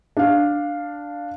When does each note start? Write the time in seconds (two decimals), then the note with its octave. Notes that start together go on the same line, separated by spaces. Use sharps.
0.17 D4 F5